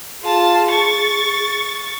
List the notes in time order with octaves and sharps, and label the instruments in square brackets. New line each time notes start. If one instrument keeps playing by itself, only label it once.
[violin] F4 A5 [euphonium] G#4
[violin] C#6 A6